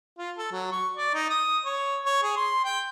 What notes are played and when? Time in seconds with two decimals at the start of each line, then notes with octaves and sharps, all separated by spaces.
0.18 F4
0.38 A4
0.52 F#3
0.72 C#6
0.97 D5
1.14 D#4
1.30 D#6
1.66 C#5
2.06 C#5
2.23 G#4
2.37 C6
2.65 G5